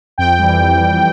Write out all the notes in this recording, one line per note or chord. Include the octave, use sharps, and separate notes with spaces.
F2 G5
E3 G3
F2
E3 G3